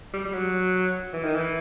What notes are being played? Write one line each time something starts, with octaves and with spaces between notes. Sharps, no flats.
G3
G3
F#3
E3
D#3
E3